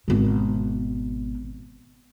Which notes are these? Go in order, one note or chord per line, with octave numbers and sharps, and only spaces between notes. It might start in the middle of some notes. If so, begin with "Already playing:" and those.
G#1 B2